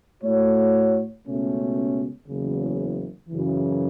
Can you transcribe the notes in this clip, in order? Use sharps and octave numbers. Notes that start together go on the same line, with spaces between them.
A2 A3 F#4 C#5
C#2 B2 A3 C#4
F#1 E2 C#3
F#2 C#3 E3